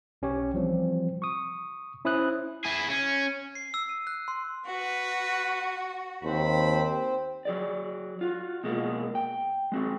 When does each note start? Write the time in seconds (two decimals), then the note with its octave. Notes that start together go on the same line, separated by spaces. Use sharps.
0.22 B1 C#4 G4 C#5
0.54 E3 F3 G3 C4
1.22 C#6 D#6
2.05 C#4 E4 C5 D#6 F#6
2.65 E4 G#4
2.90 C#4
3.55 C7
3.74 E6
3.89 D#7
4.07 F#6
4.28 C6
4.65 F#4 B4
6.24 D#2 C4 C5 B5
7.45 F#3 G#4 D5
8.21 F4 F#4
8.64 B2 G#3 A#3
9.15 G5
9.72 G#3 C4 F#4